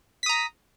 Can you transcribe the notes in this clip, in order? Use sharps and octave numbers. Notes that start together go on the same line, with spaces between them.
A#5 D#6 B6